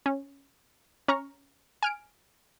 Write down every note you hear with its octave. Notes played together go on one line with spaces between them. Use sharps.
C#4
C#4 A#5 C#6 F6
G#5 F6 D7